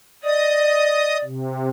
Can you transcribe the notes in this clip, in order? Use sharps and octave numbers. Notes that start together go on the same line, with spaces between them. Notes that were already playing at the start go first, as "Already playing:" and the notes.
D5 D#5 D#6
C3